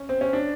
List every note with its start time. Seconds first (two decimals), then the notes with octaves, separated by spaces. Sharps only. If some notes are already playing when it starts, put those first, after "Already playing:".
Already playing: C#4
0.09 C4
0.21 C#4
0.33 D4